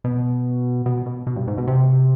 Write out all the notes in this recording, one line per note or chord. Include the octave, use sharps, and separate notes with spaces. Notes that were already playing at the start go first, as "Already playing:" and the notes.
B2
B2
B2
B2
G2
G#2
B2
C3